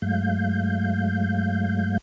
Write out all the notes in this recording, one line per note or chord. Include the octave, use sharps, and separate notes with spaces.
G2 F#3 G#3 A3 F5 G6